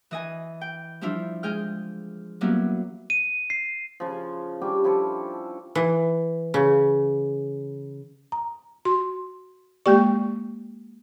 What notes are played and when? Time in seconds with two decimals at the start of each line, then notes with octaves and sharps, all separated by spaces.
0.11 E3 D#5 G#5
0.61 G5
1.01 F3 G3 D4 E4 F4
1.43 G#3 G#4 G5 F6
2.41 F#3 G3 A#3 B3 C#4 E4
3.10 D#7
3.50 C7
4.00 C#3 F3
4.61 G3 C#4 D4 G4
4.84 F3 E4 G4 A4
5.75 E3
6.54 C#3
8.32 A#5
8.85 F#4 C6
9.86 G#3 A#3 G4 D5 G5 C#6